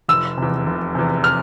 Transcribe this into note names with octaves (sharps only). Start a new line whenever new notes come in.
F1 E6
E2 C3
F1
E2 C3
F6